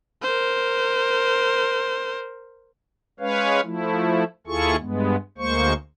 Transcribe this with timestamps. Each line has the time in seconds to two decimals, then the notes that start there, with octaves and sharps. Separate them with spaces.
0.23 A#4 C5
3.20 G#3 C#4 B4 C#5 F5
3.63 F3 A3 E4
4.47 D#2 E4 F4 G#4 A4 C#6
4.80 G2 G#3 B3
5.38 D2 G#3 A#3 C5 C#6